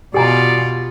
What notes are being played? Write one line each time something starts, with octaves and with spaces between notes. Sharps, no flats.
B2 F4 G4 D5 G#5 A#5